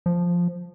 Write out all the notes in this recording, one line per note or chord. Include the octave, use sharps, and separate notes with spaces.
F3